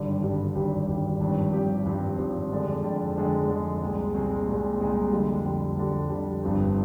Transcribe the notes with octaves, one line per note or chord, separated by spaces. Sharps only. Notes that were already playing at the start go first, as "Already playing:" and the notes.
Already playing: G#1 G2 D3 G3
G#1 G2 D3 G3
G#1 G2 D3 G3
G#1 G2 D3 G3
G#1 G2 F3 C4 G4
G#1 G2 F3 C4 G4
G#1 G2 F3 C4 G4
G#1 G2 F3 C4 G4
F2 D3 G#3 D4
F2 D3 G#3 D4
F2 D3 G#3 D4
F2 D3 G#3 D4
C2 A#2 G#3 C4
C2 A#2 G#3 C4
C2 A#2 G#3 C4
C2 A#2 G#3 C4
F2 D3 G3
F2 D3 G3
F2 D3 G3
F2 D3 G3
G1 G2 F3 C4